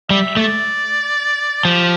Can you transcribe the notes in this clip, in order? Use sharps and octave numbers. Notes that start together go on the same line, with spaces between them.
G3 E5
A3 D5
F3 G4